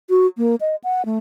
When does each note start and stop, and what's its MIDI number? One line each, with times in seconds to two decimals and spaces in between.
0.10 0.27 66
0.38 0.55 58
0.61 0.76 75
0.84 1.05 78
1.05 1.18 57